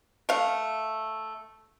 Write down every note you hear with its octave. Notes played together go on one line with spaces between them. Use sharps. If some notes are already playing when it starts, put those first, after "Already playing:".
A3 F5